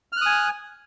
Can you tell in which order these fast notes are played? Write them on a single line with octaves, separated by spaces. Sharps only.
F6 F#6 D#6 G#5